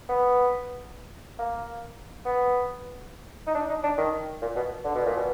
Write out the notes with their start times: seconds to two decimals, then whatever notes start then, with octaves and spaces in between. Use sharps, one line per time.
0.09 B3
1.39 A#3
2.25 B3
3.47 D#4
3.55 D4
3.69 D#4
3.83 D4
3.98 D#3
4.41 A#2
4.56 B2
4.84 D3
4.95 B2
5.06 A#2
5.16 B2